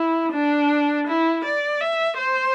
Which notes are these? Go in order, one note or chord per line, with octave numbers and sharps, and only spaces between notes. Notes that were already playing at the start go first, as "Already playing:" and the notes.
Already playing: E4
D4
E4
D5
E5
C5